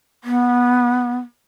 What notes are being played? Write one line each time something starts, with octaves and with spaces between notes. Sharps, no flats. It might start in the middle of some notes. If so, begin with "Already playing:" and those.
B3